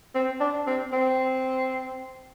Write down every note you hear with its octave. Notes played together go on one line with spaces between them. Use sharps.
C4
D4
C4
C4